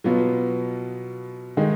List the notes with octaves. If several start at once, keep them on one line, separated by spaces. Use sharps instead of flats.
B2 F#3 B3 F4
D#3 G#3 D#4